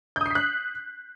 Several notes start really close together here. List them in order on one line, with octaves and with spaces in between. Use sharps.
G6 D#6 C7 B6 F#6